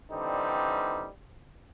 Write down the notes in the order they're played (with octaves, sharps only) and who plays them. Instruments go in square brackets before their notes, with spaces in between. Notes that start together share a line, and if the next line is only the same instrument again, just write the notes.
[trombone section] D3 E3 G3 C4 D#4